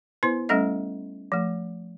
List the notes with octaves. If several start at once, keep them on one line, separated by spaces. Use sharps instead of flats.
B3 E4 B4 C5 C6
G3 A3 C#4 A4 D#5
F3 A3